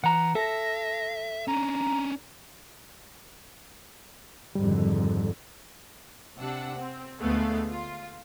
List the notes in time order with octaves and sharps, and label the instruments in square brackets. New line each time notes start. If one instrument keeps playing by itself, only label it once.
[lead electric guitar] E3 [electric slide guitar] F#5 A#5
[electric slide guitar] A4 [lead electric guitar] E5 [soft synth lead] A#6
[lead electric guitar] C#4 D4 [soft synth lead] A#5
[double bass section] G#1 F2 D3 [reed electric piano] G3
[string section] C3 D4 F#5 E6
C4
D2 D3 G#3 A3 B3 F5
F4